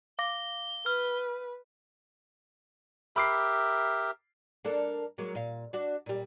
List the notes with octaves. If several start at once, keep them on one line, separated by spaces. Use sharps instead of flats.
F5 D6 A#6 G7
B4 F6
G4 A#4 E5 B5 D6 C7
A#3 D4 A4
F#3 G#3 A#3
A#2 F5
D4 F#4
A#2 G3